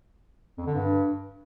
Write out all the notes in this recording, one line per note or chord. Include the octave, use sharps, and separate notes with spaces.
F2
D3
G2